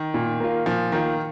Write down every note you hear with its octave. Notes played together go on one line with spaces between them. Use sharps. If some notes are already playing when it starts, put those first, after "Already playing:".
Already playing: D#3
A#2
A#3 F4
A#2 F3
D#3 A#3 F4